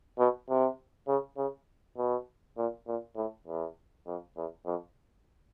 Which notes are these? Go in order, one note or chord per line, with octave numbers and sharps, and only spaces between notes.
B2
C3
C#3
C#3
B2
A#2
A#2
A2
E2
F2
E2
F2